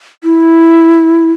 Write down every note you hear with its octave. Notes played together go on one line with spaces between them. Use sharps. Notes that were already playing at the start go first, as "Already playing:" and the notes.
E4